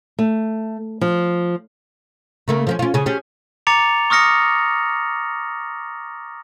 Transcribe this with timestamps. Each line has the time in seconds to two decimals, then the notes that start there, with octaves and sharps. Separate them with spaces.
0.19 A3
1.01 F3
2.48 C#3 A3 A#3
2.67 F3 A#3 C#4
2.79 C#4 F4
2.94 C#3 C#4 G#4
3.06 C#4 G4 G#4
3.67 A#5 D6 A6 C#7 F7
4.10 C#6 D#6 F6 A#6 C#7